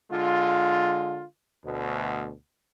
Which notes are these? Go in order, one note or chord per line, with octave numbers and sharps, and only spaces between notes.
D3 G#3 F4
D2 B2